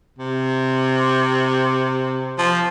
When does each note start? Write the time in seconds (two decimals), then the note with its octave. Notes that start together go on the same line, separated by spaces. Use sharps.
0.18 C3
2.39 F3